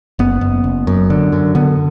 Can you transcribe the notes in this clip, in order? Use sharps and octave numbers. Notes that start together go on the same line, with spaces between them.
F#1 B3
F#1
F#1
F#2
D3
F#2
D3 B3